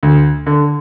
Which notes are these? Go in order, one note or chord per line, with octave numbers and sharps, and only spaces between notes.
D2
D3